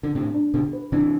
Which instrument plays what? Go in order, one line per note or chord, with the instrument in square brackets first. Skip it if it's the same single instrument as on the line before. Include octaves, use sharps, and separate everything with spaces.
[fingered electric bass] D3
[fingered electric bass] A2 C3 [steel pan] D4
[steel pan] D4
[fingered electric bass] B2 D3 [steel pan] G4
[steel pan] B4
[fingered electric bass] C3 E3 [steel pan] D4